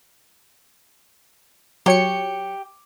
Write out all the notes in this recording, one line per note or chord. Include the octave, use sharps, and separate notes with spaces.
F#3 G4 C#5 C#7